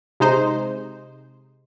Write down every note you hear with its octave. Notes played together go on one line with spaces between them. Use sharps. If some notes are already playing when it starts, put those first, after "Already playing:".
C3 G#3 D#4 C5